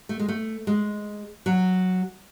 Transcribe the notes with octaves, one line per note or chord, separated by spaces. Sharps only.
A3
G#3
A3
G#3
F#3